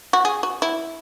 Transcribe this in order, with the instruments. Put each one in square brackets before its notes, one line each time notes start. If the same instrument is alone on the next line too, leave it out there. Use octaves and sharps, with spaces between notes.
[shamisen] F#4
G#4
F#4
E4